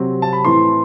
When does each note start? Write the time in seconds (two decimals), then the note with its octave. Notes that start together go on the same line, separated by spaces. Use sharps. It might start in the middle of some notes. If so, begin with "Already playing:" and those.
Already playing: C3 F#3 C4
0.22 A5
0.33 B5
0.44 A2 E3 A3 C4 C6